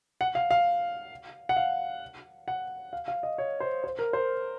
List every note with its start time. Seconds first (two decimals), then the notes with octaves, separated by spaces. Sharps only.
0.21 F#5
0.35 F5
0.51 F5
1.49 F#5
1.56 F5
2.48 F#5
2.93 F5
3.08 F5
3.23 D#5
3.38 C#5
3.60 C5
3.84 C5
3.99 A#4
4.13 C5